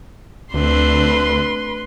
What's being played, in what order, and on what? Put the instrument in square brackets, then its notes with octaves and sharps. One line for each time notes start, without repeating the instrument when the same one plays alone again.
[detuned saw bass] D2 [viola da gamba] A3 C4 D4 [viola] B4 C6